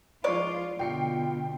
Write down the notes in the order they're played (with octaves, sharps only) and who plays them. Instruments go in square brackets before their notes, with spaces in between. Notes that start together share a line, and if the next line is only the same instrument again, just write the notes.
[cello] F3 F4 [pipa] G#3 C#5 D5
[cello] B2 D3 [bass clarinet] F4 [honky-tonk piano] G5 C7 C#7